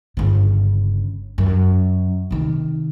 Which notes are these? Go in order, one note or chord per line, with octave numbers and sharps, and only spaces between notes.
G1 C#3
F#2
C3 D#3